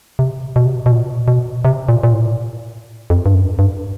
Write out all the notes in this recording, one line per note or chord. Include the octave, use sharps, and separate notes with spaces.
C3
B2
C3
B2
B2
A#2
B2
C3
A#2
A#2
A2
F2
G2
F#2
G2